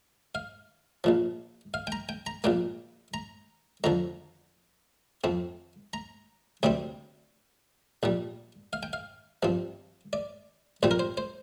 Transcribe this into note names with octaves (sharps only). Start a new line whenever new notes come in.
F5
A#1 A#2 F3
F5
G5
A#5
G5
A#5
A#1 A#2 A#3 G5
A#5
F2 D3 F3 A#5
F2 F3 C4
A#5
D2 C3 G3 C4 G5
A#1 A#2 G3
F5
G5
F5
G2 F3 C4
D5
A#1 A#2 G3 C4 C5
A#4
C5
C5